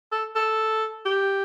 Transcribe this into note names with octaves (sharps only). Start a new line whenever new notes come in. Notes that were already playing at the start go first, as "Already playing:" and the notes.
A4
A4
G4